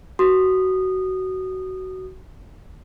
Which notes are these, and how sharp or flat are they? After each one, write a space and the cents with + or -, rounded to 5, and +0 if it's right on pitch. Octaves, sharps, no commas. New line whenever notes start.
F#4 +20 D#6 -20